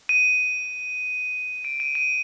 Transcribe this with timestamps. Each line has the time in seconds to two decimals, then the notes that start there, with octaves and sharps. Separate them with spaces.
0.09 D#7
1.65 D7
1.80 D#7
1.95 D#7